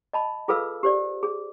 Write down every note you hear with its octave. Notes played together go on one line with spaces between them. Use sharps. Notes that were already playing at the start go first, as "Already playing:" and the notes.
D#5 A5 B5
F4 G#4 A4 B4 F5 E6
G4 C5 D5
G#4